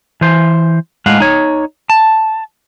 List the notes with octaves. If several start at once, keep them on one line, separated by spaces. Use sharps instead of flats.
E3 C5
A2 G#3 F5 F#5
D#4 C#5
A5